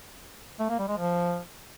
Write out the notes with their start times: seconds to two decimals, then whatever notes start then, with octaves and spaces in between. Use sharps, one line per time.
0.60 A3
0.69 A#3
0.79 G3
0.88 G#3
0.98 F3